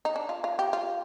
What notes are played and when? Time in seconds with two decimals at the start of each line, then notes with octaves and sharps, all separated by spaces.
0.05 D#4
0.16 D4
0.29 F4
0.44 F4
0.59 G4
0.73 F4